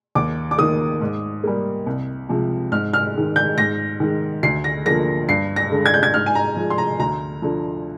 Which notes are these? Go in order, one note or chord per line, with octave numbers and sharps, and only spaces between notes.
D#2 D6
D6
D#3 A#3 D#6
G#2
G3 A#3
C2
C3 F3 G#3
G#2 F6
F6
D#3 G#3
G6
G#2 A#6
D#3 G#3
D2 C7
A#6
D3 F3 A#3 A#6
G2 C7
A#6
D3 G#3
G#6
G6
G#6
G#2 F6
G#5
A#5
F3 G#3
C6
A#5
D2 A#5
D3 F3